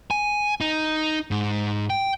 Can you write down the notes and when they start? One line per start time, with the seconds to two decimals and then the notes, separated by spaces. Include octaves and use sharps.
0.11 G#5
0.61 D#4
1.31 G#2
1.90 G5